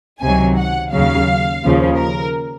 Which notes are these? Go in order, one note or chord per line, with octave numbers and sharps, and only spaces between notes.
C#2 C3 D#3 F#3 G#5
F#5
D#2 C#3 F#3 F5
D#2 C#3 F3
A#4